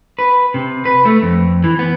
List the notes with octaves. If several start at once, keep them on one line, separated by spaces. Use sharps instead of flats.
B4
C3
B4
A3
F2
E3
B3